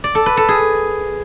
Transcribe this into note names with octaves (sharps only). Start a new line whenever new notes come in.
D5
A4
B4
A4
G#4